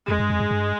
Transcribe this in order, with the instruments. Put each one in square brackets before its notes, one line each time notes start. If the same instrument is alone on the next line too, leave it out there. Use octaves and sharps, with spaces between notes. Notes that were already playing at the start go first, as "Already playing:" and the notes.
[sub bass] F2 [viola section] G#3
[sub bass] G2
F2
G2
G2